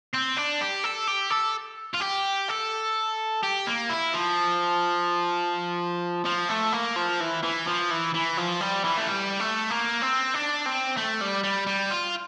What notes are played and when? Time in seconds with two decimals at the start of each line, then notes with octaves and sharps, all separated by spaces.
0.14 C4
0.37 D4
0.61 G4
0.84 A4
1.07 G4
1.31 A4
1.95 F4
2.01 G4
2.49 A4
3.43 G4
3.67 A#3
3.90 E4
4.13 F3
6.25 F3
6.49 A3
6.73 A#3
6.96 F3
7.20 E3
7.43 E3
7.67 F3
7.90 E3
8.14 E3
8.37 F3
8.61 G3
8.84 E3
8.98 A3
9.08 G3
9.40 A3
9.71 A#3
10.02 C4
10.34 D4
10.66 C4
10.97 A3
11.21 G3
11.43 G3
11.67 G3
11.91 F4